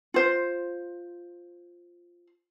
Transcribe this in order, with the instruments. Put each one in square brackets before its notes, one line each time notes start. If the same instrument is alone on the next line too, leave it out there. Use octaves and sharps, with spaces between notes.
[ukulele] F4 C5